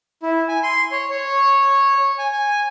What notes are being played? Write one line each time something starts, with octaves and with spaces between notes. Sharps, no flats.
E4
G#5
C6
C#5
C#5
G#5
G#5